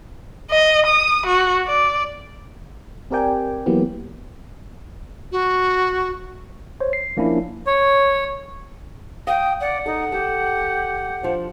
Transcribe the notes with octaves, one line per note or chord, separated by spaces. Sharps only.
D#5
D#6
F#4
D5
C4 G4 A#4 D5 G5 G#5
E3 F#3 A#3 B3 G4
F#4
C5 C#5
C7
F3 A#3 C#4 D4 E4
C#5
F5 G5 D#6
D5 F#5
D#4 A4
G4 A4
F3 D4